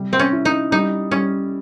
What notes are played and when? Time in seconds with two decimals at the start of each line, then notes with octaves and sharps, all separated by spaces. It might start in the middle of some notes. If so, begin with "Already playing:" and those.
Already playing: C3 G3
0.13 C4
0.19 C#4
0.33 E4
0.45 D#4
0.72 G3 D#4
1.11 G3 C#4